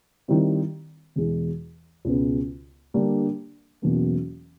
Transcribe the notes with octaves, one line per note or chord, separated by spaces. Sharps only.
D#3 G3 C4 E4
E2 B2 G#3
C#2 B2 G#3 B3
D3 G3 A#3 D4
E2 B2 F#3 A#3 C#4